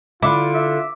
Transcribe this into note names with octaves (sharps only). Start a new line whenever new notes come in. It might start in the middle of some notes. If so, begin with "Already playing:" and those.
D3 E4 F4 D6
E5